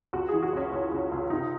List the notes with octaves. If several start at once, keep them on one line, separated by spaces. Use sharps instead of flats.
C#2 F#4
E3 G#4
F#4
C#2 C#4
C#2
C#2
C#2
C3 D#4